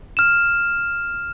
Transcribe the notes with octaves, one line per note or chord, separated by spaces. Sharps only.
F6 E7